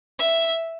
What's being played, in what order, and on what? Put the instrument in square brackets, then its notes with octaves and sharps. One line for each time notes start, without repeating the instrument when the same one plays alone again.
[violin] E5